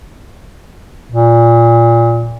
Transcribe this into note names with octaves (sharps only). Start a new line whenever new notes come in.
A#2